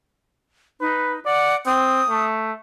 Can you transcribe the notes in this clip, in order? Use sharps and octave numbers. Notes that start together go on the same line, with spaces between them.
D#4 B4
D5 F#5
C4 D#6
A3